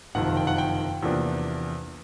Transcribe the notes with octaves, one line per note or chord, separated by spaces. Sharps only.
F#1 F2 C3 D#3 F#5
G5
F#5
G5
E2 C3 F3 A#3 D4